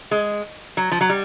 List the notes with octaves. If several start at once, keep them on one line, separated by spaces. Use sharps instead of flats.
G#3
F#3
F3
F#3
G3